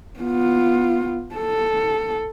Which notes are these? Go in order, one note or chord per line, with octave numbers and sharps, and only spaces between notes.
B3 F4
A4